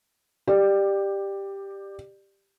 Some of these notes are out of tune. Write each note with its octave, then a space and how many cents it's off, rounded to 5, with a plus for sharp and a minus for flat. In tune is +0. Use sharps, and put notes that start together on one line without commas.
G4 +5 D5 +20